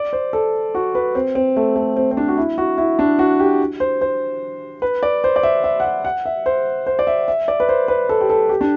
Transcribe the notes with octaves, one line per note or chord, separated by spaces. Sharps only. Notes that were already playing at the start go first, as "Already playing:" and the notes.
Already playing: D5
C5
A4
F#4
B4
C4
C4
A3
A3
C4
C4
D4
F#4
E4
F#4
E4
D4
F#4
G4
C5
C5
B4
D5
C5
D5
E5
E5
F#5
E5
F#5
E5
C5
C5
D5
E5
E5
D5
B4
C5
B4
A4
G4
A4
G4
D4